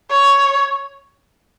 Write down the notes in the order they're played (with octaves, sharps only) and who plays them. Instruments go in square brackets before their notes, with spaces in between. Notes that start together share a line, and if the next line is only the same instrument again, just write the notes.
[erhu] C#5